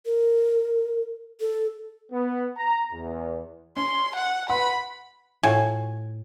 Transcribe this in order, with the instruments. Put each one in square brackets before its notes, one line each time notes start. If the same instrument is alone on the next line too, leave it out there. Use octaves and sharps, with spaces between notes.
[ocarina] A#4
A4
[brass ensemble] B3
A#5
E2
[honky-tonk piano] C#4 [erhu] C6
[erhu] F#5
[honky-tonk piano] B4 F#5 C6 [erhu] B5
[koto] A2 [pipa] F4 F#4 G#5